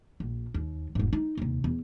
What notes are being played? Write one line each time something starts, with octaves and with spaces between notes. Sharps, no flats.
A#1
D#2
E1 G#2
D#4
D#2 C3
E2